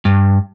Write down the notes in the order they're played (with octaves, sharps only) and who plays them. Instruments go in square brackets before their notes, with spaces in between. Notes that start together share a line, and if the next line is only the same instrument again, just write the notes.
[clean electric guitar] G2